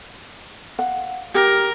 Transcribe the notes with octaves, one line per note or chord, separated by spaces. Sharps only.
F5 F#5
G4 A#4